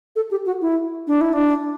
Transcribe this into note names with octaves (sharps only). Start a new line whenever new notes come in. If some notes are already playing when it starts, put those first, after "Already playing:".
A4
G4
F#4
E4
D4
E4
D4